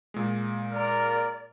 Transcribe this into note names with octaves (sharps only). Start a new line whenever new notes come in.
A#2 G#3
A#4 D5